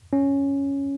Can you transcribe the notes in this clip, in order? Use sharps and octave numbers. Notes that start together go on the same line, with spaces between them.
C#4